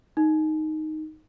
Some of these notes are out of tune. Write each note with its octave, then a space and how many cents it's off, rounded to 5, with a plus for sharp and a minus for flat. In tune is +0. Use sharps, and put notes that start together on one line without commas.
D#4 +0